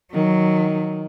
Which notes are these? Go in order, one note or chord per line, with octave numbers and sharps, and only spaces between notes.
D#3 F#3